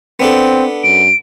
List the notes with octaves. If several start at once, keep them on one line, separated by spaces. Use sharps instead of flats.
B3 C4 D4 A4
F#2 D7